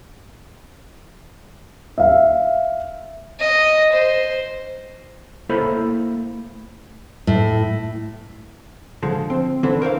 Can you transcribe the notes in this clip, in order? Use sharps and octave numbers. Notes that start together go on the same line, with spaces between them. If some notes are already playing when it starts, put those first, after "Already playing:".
E5 F5
D#5
C5
A3 A#3 E4 A4 C5 B5
A2
D3 F3 G#3 A4
C4
D3 E3 C4 D4 A4
A#4 C5 C#5 F5